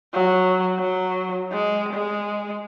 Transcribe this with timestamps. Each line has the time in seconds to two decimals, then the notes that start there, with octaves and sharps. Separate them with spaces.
0.14 F#3
0.80 F#3
1.52 G#3
1.93 G#3